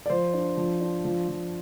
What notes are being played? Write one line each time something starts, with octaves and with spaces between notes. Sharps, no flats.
D5
F3 C5
D4
F3
D4
F3
F3